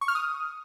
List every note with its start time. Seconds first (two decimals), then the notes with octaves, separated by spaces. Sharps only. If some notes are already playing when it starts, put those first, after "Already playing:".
0.01 C#6
0.08 F6
0.15 D#6